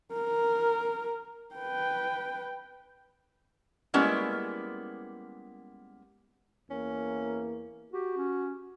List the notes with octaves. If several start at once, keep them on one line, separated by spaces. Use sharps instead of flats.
A#4
B4 G5
G3 G#3 A#3 B3 C#4 E4
E2 A#3 C#4
F#4 G4
C#4